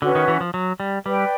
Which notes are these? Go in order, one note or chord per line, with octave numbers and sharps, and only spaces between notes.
D3 C#4 F#4 B4
D#3
E3
F3
F#3
G3
G3 B4 D5 G5